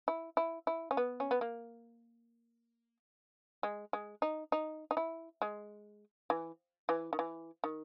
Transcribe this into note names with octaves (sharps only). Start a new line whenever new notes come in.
E4
E4
E4
C#4
B3
C#4
B3
A#3
G#3
G#3
D#4
D#4
D#4
E4
G#3
E3
E3
D#3
E3
D#3